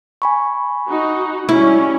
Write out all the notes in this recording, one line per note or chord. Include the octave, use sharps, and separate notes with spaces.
G#5 B5 C#6
D#4 F#4
G3 C#4 E4